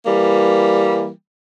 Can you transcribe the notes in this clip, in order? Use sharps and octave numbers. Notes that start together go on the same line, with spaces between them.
E3 G3 A#3